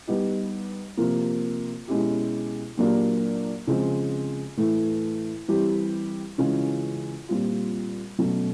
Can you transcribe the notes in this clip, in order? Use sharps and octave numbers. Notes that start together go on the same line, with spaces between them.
G3 B3 D#4 G4
C3 F3 A#3
B2 G#3 C#4 E4 G4
A#2 F#3 A#3 D4 G4
C#3 F3 G#3 C4
A2 E3 A3
E3 G3 C4 E4 G4
C#3 E3 G#3 C#4 F4
A#2 G3 C4 F4
B2 F#3 A3 C#4